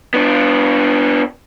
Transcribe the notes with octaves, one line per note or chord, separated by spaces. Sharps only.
B3 D4